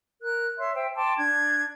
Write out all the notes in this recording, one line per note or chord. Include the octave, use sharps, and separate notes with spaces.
A#4 F#6
C#5 E5 C6
C5 E5 G5
G5 A5 C6 D6
D4 G#6